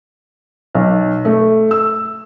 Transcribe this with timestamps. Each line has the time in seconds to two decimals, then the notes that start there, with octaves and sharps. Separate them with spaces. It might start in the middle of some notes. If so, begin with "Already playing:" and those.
0.75 B1
1.25 A3
1.71 E6